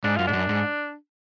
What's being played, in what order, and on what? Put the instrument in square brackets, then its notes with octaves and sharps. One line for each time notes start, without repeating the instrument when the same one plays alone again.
[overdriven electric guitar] G#2 [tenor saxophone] D4
[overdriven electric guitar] F#2 [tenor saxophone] F4
[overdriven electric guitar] G#2 [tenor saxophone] D4
[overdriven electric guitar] F#2
G#2